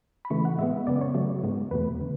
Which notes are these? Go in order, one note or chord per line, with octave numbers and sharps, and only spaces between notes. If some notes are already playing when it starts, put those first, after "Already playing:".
B5
C#3 E3 A3 C#6
F#5
A2 G#3 B3 E5
F#2 C#3 G#3 B3 D5
C#5
C#3 F#3 A3
G#2 G#3 B3
E2 B2 A3 B4
D3